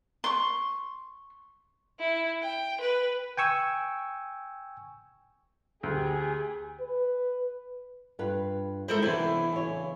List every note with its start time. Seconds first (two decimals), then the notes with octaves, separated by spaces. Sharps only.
0.24 C6 C#6
2.00 E4
2.42 G5
2.81 B4
3.37 G5 G#5 C#6 E6
5.83 D2 G4 G#4
6.80 B4
8.19 G2 F4 B4
8.88 F3 G#3 E4 A4 A#4 C5 B5
9.02 B1 C3 E3 B3 D4 E4 C5
9.52 C#3 C#5